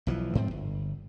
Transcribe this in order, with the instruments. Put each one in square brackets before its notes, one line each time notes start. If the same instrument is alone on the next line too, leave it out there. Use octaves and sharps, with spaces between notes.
[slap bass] B1 E3 F3
G#2 F3 C4
G1